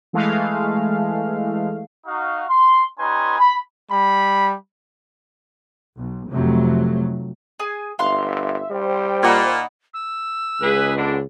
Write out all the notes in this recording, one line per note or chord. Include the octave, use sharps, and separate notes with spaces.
E3 G#3 A3 F5
D#4 F#4 F5
C6
G3 C#4 D#4 B4 G#5 C6
B5
G3 B5
B1
F1 F2 C3 F#3 A3
G#4 G#5
G1 E5 F5 C6 F#6
G3 C5 G5
A#2 D#4 F#5 B5
E6
C#2 G#4 B4
D3 B3 D4